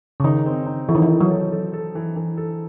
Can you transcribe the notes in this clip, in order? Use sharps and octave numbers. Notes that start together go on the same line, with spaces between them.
C#3
D#3 D#4
C4
D#4
E3 A4
D#3
E3
A4
F#3
A4
A4
A4
E3
E3
A4